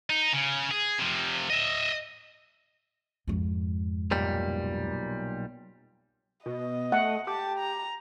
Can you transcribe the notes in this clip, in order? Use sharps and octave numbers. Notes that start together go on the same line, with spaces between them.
D#4
C#3
G#4
C3 F3
D#5 E5
F2 G#2
B1 A#2 G3
B2 D#5
A3 F#5
G4 A5
A#5